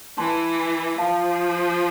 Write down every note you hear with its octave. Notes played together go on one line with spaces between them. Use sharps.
E3 A5 C6
F3 F5 A5